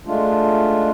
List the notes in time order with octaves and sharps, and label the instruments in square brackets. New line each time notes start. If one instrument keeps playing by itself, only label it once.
[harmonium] G#3 A3 D4 F4